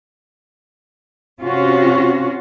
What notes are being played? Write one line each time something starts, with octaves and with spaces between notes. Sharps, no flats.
C3 C#4 F4 F#4